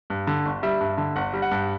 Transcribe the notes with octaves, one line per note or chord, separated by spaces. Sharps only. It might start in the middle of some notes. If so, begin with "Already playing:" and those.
G2
D3
G1
G3 E5
G2
D3
G1 F#5
G3
F#5
G2